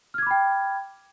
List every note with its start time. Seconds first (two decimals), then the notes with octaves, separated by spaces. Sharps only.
0.14 F6
0.18 G#6
0.22 D6
0.26 B5
0.31 G5